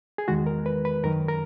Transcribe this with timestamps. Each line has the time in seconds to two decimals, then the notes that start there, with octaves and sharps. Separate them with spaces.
0.18 G#4
0.28 E2 D#3 G#3 F#4
0.46 A#4
0.66 B4
0.85 B4
1.04 F#2 D#3 F#3 A#4
1.28 A#4